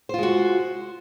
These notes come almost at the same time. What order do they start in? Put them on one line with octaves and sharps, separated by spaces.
C5 F4 G#3 F#4